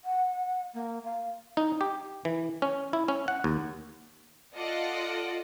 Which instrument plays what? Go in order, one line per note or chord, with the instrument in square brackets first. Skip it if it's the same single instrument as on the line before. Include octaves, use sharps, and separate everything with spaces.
[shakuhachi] F#5
A#3
F5
[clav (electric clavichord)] D#4
G4
E3
C#4
E4
C#4
F#5
D#2
[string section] F4 A4 D5 D#5 F#5